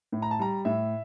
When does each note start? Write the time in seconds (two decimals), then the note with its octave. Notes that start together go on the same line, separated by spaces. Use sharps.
0.12 A2
0.22 A#5
0.31 A5
0.39 G3 A#5
0.65 A2 E5